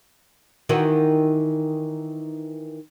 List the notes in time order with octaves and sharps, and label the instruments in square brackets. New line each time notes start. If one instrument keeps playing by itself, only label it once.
[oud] D#3 E3 F#4